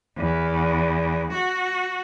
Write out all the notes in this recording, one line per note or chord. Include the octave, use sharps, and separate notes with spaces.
E2
F#4